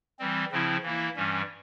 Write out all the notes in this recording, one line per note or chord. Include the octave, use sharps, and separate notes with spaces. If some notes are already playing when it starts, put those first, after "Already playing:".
E3 G3 C4
C#3 F3 C4 E4
E3 A#3 E4
G2 E3 G3 C#4